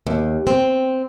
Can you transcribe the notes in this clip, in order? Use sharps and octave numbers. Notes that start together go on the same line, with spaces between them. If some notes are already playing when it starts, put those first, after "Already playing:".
D#2
C4